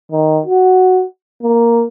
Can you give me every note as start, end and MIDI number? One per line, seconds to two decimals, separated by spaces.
0.11 0.40 51
0.46 1.05 66
1.43 1.84 58